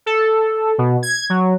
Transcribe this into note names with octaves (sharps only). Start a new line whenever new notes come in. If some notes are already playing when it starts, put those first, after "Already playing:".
A4
B2
G#6
F#3